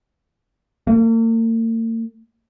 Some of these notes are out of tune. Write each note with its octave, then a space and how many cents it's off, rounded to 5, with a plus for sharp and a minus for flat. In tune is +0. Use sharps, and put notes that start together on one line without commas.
A#3 -45